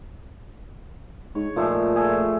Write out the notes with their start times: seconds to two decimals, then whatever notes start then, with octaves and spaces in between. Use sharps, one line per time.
1.35 G#2 C#5
1.56 A#2 F3 A3 G#4
1.96 A3 G#4